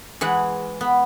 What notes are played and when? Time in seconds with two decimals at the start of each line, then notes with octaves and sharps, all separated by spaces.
0.21 E3 G#3 F#5
0.81 B3